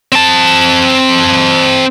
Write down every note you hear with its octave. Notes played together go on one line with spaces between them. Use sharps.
C4 A5